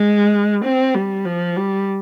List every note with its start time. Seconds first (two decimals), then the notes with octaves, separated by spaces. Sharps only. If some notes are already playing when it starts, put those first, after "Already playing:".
Already playing: G#3
0.65 C4
0.95 G3
1.26 F3
1.57 G3